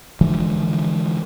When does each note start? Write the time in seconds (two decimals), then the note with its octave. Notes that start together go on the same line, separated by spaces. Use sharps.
0.21 D3 E3 F3 G#3